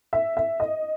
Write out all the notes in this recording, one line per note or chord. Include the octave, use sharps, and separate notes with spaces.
E5
E5
D#5